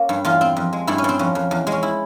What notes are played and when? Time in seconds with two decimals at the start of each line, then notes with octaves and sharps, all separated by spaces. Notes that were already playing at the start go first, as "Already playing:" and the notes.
Already playing: A#3 C#4
0.09 G2
0.25 E2 F4
0.41 C4
0.57 F2
0.73 G#3
0.87 G2 E4
0.98 C#4
1.04 G2 C4
1.19 F2 C#4
1.35 F2
1.51 E2
1.67 G#3
1.72 C#4
1.83 E4